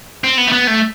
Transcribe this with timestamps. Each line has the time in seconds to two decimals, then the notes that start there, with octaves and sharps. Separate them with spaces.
0.24 C4
0.38 B3
0.48 A3
0.52 B3
0.67 A3